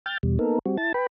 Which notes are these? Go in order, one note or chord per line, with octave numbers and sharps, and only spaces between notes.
G5 F6 G6 A6
E2 B2 G3
A#3 B3 D#4 A4 A#4
G3 C4 F#4
E4 A5 A6
B4 G5 B5